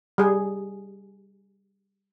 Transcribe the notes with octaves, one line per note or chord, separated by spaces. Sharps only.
G3 G#4